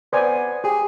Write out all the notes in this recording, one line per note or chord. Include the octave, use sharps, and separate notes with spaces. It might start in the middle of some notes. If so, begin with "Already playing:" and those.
B3 C5 D5 G#5
G4 G#4